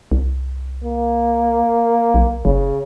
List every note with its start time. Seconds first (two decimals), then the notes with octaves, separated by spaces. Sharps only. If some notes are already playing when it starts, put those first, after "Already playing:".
0.12 C2
0.84 A#3
2.14 B1
2.45 F#1 C#3